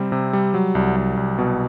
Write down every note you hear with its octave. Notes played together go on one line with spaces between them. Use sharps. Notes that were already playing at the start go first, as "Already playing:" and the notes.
Already playing: C3 G3 C4
C3
G3
F#3
C2
C2
C2
B2